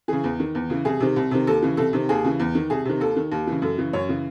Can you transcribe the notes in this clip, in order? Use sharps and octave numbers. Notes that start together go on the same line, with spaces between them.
C#3 E3 G#4
E2
D#3
E2
C#3 E3
C2 G#4
C3 D#3
C2
C3 D#3
D#2 A4
C#3 E3
C2 A4
C3 D#3
D#2 G#4
C#3 E3
E2
D#3
C2 G#4
C3 D#3
D#2 A4
D#3
D#2
C#3 E3
F#2 A4
C#3 E3
F#2 C#5
C#3 E3